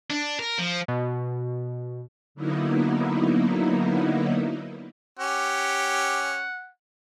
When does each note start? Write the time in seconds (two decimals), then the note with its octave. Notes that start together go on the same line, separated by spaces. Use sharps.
0.10 D4
0.39 A#4
0.59 F3
0.88 B2
2.35 D3 F#3 A#3 B3 D#4 E4
5.19 C#4 G4 F#5